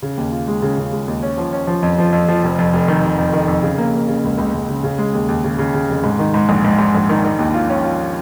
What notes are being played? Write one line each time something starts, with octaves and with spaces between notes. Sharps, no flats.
C#3
D#2
F4
G#3
C#3
C#3
G#3
D#2
C#4
F3
C#4
F3
F2
F3
F2
F3
F1
F2
F1
D#3
F1
F2
D#3
F2
C#3
A#3
A#3
C#3
C#2
C#2
C#2
C#3
C#3
G#3
D#2
D#2
C#3
C#3
C#3
F1
G#2
D#3
G#2
A#1
G#2
G#2
A#1
D#3
D#3
D#2
F4
C#4
F4